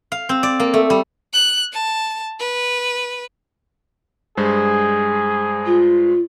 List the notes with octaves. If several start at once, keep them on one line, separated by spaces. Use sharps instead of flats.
F5
C4
D5
A#3
A3
G3
F#6
A5
B4
G2 G#3 G#4 C5
F4